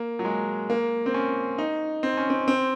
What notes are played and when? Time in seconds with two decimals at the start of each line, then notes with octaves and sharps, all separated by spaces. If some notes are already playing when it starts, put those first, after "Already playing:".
Already playing: A#3
0.19 F#3
0.25 G#3
0.70 A#3
1.06 C4
1.14 C#4
1.58 D#4
2.03 C4
2.17 C#4
2.30 C4
2.48 C4